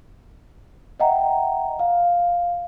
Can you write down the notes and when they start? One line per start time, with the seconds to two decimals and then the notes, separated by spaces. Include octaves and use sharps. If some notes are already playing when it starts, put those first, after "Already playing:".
1.00 D#5 E5 F#5 G5 A#5
1.79 F5